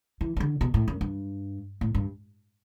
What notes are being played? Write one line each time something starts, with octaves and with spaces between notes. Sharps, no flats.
E3
E3
D3
B2
A2
F#2
G2
A2
G2